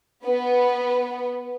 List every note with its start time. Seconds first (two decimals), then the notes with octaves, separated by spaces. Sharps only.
0.25 B3